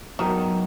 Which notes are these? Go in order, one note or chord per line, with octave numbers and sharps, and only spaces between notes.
G#2 D#3 F#3 B3 F#4 A#4